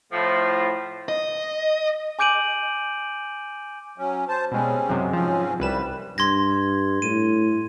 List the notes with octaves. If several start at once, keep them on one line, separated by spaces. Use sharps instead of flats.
A2 F3
D#5
G#5 D6 G6 D7 D#7 F#7
F#3 C#4
C5 A5
B2 G3 G#3 C4 C#4
F#2 C3 G#3
G#2 F3 C4 C#4
C2 G3 B4 E7
G2 C6 G#6 A#6
A2 D#7